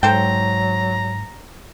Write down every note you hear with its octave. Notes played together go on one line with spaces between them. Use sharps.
G#2 F#3 A4 C5 G5 A#5